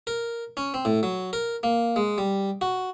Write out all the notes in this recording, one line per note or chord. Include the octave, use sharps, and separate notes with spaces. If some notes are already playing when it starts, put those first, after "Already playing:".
A#4
C#4
C4
A2
F#3
A#4
A#3
G#3
G3
F#4